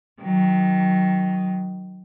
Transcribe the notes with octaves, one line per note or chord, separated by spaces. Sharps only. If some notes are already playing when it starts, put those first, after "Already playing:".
D#3 F#3